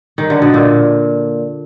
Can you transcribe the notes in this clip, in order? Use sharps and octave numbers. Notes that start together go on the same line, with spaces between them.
D#3
D3
B2
A#2